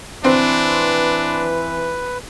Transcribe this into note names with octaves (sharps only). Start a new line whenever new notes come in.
E3 C4 D4 B4